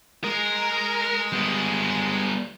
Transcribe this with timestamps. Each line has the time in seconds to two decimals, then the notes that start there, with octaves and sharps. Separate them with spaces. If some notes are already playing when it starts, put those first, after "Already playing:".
0.24 G#3 A#4
1.32 G3 B3